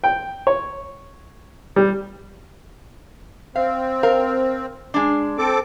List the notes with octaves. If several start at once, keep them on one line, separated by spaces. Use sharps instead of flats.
G5
C#5
G3
C4 F5
A#4 F5
G#3 D4
C4 A4 D6